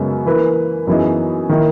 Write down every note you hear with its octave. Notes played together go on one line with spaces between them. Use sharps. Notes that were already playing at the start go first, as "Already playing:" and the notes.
Already playing: F#2 C#3 G#3 B3
E3 A#3 E4 B4
F#2 E3 B3 D#4 G#4
D#3 A#3 E4